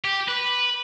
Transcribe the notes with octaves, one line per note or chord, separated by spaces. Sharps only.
G4
B4